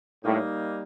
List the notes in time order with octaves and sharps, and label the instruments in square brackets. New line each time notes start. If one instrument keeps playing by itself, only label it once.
[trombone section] A2 [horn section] G3 A#3 D#4